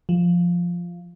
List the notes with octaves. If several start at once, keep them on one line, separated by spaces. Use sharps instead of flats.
F3